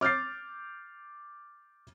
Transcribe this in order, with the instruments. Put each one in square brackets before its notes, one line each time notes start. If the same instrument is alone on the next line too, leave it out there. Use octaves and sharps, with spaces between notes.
[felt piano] D6 F6 G6 A6 C7